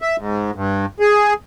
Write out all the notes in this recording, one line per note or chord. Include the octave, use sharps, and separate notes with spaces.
E5
G#2
G2
G#4